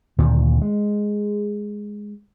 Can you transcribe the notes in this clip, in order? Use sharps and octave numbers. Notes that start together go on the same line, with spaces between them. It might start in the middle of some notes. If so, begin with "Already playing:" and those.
D2 A#2 D#3
G#3